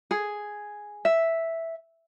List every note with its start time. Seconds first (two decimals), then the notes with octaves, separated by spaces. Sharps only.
0.11 G#4
1.05 E5